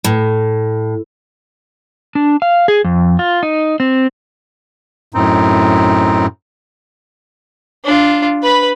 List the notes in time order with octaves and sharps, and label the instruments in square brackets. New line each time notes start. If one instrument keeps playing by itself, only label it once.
[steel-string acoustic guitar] A2
[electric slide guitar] D4
F5
G#4
F2
F4
D#4
C4
[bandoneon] F#2 A2 [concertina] C4 D#4
[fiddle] D4 F4
B4 B5